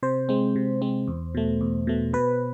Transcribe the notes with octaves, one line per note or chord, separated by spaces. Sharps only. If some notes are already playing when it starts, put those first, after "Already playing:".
C3 C5
G#3 C4
C3
G#3 C4
E2
B2 A3
E2
B2 A3
B2 B4